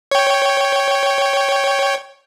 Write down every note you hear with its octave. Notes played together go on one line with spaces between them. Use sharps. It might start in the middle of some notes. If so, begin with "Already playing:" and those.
C#5 G5